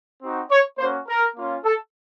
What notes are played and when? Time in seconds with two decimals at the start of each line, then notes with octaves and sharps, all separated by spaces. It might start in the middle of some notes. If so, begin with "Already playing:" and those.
0.22 C4 D#4 F#4
0.50 C#5
0.78 A#3 C#4 F#4 C5
1.07 A#4
1.36 A#3 C#4 F4
1.64 A4